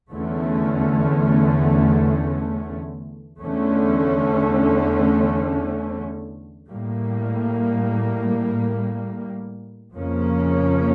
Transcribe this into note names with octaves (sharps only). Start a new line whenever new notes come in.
E2 D3 A3 C#4
E2 D3 A3 C#4
A2 G3 A#3
F2 C#3 F3 A#3 C#4